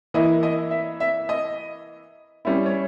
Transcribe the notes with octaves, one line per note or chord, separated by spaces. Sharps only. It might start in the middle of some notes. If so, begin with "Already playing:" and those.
E3 A#3 E4 D#5
D#5
E5
E5
D#5
G3 C#4 E4
C#5